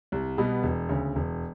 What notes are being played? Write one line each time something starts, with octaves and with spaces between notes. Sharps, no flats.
C2
B2 G3 B3
E1
D2 C#3
E1